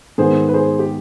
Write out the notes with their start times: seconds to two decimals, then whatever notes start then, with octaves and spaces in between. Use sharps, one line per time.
0.18 G#2 D#3 B3 G#4 C5
0.49 B4
0.54 G#4 C5
0.79 G4